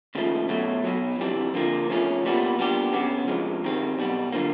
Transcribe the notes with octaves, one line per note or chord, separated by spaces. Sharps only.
D#2 C#3 F3 A3
B2 F#3 A3
B1 B2 F#3
F2 C3 E3 G3
D3 F3 A#3
E2 C#3 F3 A3 C#4
C2 A#2 G3 B3
A#2 G3 B3 D4 G4
F#2 C#3 F#3 B3
F2 C3 F3 G#3
G2 D#3 G3 C4
B1 B2 G3 B3
D3 F3 A#3